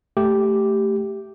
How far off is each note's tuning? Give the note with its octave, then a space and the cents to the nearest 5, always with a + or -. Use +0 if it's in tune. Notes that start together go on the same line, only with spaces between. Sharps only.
A3 +0 G4 -5